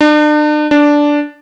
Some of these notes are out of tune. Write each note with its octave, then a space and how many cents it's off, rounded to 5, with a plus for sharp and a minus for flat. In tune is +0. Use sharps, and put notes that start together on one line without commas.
D4 +40
D4 -5